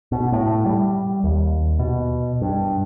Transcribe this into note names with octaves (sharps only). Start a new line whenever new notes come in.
B2
A2
G3
D#2
B2
G2